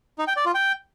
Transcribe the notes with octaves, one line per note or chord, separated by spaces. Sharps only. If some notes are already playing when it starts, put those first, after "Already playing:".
D#4
G5
D5
F4
G5